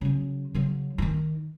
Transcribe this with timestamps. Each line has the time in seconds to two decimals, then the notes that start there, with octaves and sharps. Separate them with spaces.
0.01 C#3 F#3
0.54 C#3 F#3
0.98 D#3 D#4